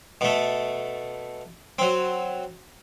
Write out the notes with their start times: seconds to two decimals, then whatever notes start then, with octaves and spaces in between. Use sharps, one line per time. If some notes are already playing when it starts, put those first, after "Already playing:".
0.21 B2 A3
1.79 F#3 C4